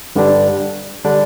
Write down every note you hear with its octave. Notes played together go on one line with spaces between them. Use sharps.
G2 D3 G3 D4
D3 G3 D4